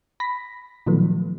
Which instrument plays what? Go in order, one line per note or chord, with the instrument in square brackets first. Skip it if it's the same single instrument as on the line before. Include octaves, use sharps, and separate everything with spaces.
[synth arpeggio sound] B5 A#6 B6
A#2 D#3 F3 F#3 A3 B3